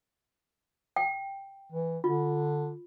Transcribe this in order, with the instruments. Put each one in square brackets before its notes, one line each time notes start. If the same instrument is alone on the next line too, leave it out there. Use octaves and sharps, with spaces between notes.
[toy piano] G5
[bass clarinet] E3
[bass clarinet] D3 [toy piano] F4